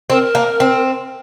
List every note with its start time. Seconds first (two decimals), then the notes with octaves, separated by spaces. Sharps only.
0.10 C4 A#4
0.35 A#3
0.60 C4